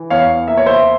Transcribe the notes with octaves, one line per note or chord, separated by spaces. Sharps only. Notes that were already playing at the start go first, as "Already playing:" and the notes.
Already playing: E3
E2 C#5 F5
A#3 E5
C#5
C5 E5